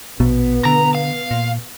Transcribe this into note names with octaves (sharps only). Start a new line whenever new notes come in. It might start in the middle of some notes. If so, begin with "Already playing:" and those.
A#1 B2 B3
D3 A#5
F5
A#2